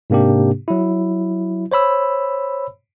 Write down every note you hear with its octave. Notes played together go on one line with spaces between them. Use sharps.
G#2 C3 A#3 D4 G4
F#3 E4
C5 C#5 B5 E6